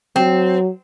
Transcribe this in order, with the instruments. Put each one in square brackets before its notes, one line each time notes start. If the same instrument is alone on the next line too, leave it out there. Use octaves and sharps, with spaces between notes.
[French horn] F#3 [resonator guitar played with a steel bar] C4